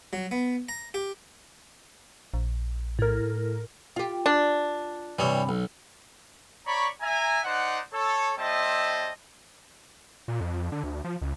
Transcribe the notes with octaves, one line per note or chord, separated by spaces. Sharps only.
F#3
B3
A#5
G4
A#1
A2 A#4
F4 G4
D4
G2 C3 E3 G3 C#5
B1
C#5 D5 A#5 B5 C#6
E5 G#5 A#5
D#4 C5 D5 F#5
A4 C#5
G3 C4 C5 D#5 E5 A5
A#2
F2
F2
D3
D2
F3
C#2